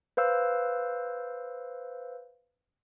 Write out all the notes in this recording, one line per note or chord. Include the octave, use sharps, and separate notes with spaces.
B4 C5 F5 E6